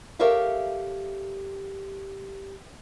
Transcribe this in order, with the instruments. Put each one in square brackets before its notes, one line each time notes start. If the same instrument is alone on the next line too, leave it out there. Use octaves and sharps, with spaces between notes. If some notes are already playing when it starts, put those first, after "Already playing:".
[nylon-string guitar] G4 A4 A#4 C#5 E5 F5